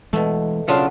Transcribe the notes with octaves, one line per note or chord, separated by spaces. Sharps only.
B2 E3 G#3 A3
C#3 F#3 D4 F4